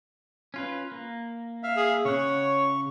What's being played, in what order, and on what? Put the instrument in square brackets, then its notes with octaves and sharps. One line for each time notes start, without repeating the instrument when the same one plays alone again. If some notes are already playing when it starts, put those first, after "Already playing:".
[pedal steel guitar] C#4 F4 B4
A#3
[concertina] E5 F5
[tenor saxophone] G#4
[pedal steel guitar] C#3 F#5 [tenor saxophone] C#5 [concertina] C#6